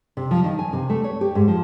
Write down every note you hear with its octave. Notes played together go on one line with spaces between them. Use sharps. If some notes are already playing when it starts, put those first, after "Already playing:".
C3
F3
D#3
G#5
C3
A3
C#5
G4
G#2
F3